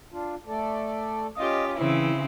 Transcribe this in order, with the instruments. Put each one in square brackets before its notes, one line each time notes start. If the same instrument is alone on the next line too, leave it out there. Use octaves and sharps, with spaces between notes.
[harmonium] D4 F4
A3 A4 D5
[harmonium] C#4 [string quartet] F4 G4 [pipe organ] D#5
[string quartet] C#3 C4 E4 [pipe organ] E3